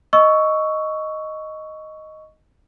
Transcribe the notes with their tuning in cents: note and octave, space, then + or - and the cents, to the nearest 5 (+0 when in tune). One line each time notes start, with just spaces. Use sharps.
D#5 +0 C#6 +10 E6 +0